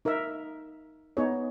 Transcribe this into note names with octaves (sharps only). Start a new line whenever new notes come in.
D#4 A#4 E5
B3 D#4 G#4 C#5